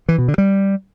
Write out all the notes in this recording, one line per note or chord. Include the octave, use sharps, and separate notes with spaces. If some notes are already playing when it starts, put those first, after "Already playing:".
E3
B2
D3
G3